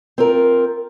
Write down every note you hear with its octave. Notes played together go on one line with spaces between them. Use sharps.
C4 F4 A#4